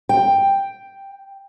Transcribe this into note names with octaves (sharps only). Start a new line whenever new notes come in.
G5